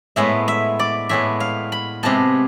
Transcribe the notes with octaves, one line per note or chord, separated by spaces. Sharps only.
A2 G#3 B3 E5
E5
D5
A2 G#3 B3 E5
F5
B5
C3 G#3 B3 A5